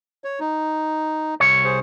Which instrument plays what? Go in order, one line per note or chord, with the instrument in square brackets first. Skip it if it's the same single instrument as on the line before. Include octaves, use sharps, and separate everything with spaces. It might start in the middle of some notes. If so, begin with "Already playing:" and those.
[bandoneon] C#5
D#4
[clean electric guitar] C2 C#5
[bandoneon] G#4 C5